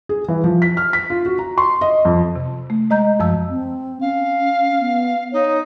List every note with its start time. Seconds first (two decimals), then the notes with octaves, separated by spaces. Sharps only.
0.09 G#4
0.28 E3
0.44 F3
0.62 B6
0.77 F6
0.93 B6
1.10 F4
1.26 F#4
1.39 A#5
1.58 C6
1.81 D#5
2.05 F2
2.36 C3
2.70 A3
2.90 G#3 D#5 A#5 G6
3.20 F#2 F3 A5 E6
3.49 C4
4.01 C#4 F5
4.80 B3
5.33 D#4 C#5